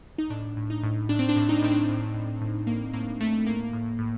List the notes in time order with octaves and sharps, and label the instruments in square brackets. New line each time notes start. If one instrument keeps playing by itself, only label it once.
[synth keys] D#4
A2 D4
A2
D#4
A2
A2 D4
C4
D4
A2
D#4
D4
A2 C4
D4
A2
A2
A2
A2 A#3
A2 A#3
A2 A3
A2 A#3
A2
A2